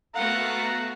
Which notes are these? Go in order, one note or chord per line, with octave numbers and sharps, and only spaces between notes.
A3 B3 F#4 F5 F#5 A#5